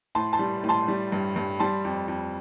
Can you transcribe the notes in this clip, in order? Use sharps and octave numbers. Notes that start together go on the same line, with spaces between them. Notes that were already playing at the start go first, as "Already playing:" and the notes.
A2 A5 C6
A5 C6
G3
A2
A5 C6
G3
G2
G2
G3 A5 C6
F2
F2